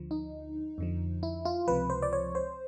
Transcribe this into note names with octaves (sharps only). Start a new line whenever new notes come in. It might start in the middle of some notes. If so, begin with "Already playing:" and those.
Already playing: D2 D3 F3
D#4
F2 D3 F3
E4
F4
C#2 C3 F3 B4
C5
D5
C#5
C5